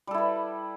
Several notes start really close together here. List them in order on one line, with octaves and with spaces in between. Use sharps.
G3 A4 E4 B4